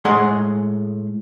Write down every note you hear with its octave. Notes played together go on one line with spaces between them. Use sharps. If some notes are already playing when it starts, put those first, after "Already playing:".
A2 G#3 G#4 F#5 C6